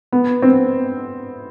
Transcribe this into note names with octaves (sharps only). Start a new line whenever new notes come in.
B3
C4